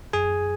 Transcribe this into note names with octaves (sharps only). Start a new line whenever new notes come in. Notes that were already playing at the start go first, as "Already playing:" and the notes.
F#2 G#4 G#5